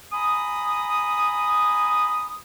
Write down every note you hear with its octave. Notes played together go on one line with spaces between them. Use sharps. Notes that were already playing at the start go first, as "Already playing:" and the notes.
G#5 A#5 B5 D#6